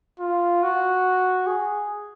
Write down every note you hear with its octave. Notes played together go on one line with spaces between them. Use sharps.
F4
F#4
G#4